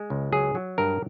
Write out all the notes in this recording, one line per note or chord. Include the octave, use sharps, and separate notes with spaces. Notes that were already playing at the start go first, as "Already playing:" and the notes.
Already playing: G#3
C#2
F#3 G#4
F#3
G2 A#4